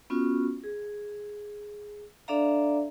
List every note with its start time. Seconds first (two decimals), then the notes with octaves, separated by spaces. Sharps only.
0.10 B3 C#4 F4 F#4
0.64 G#4
2.28 D4 A4 D5 E5 F5 A#5